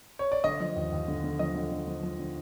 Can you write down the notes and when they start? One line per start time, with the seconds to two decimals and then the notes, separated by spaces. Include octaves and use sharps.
0.19 C#5
0.32 D5
0.44 D3 D#5
0.60 F3
0.76 D#2
0.92 D#2
1.08 D3
1.24 D3
1.39 F3 D#5
1.55 D3
1.71 D3
1.87 F3
2.03 F3
2.19 D3